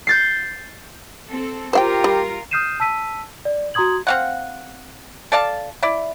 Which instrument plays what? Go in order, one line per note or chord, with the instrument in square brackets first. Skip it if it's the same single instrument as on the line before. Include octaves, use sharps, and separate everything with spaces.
[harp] G6 A6 C7
[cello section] C4 A4
[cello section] F4 A#4 [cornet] G4 [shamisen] C5 F5 G5
[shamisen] G3
[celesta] D#6 F6 G6 C7 D#7 E7
A5 E6 B6 D#7
D5
F#4 A#5 C6 D#6 G#6 F#7
[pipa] C4 F5 F#5
A4 D5 F5 A5
E4 D5